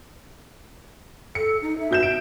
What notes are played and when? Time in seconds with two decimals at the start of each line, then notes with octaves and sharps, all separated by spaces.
1.35 A4 C#7
1.62 D#4
1.79 E5
1.91 B2 G6 E7
2.03 D7